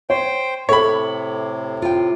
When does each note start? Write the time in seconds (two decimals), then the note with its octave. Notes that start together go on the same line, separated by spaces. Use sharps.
0.10 C5 C#5 G5
0.69 A2 C3 A4 C#5 B5
1.82 F4 G5